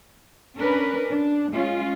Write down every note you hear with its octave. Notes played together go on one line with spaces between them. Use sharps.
C#4 D4 A#4 B4
D4
G#3 C#4 F4